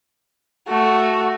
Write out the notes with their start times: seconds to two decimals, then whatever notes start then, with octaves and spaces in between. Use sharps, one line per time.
0.68 A3 F#4